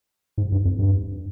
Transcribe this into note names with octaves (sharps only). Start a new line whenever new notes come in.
G#2
G2
F2
G2